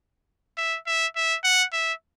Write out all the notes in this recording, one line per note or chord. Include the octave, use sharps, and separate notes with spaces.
E5
E5
E5
F#5
E5